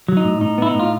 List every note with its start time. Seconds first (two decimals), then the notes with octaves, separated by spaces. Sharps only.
0.08 F#3
0.17 D#4
0.24 A2
0.41 A2 D#4
0.58 B3 E4
0.67 D#4
0.75 A2 F4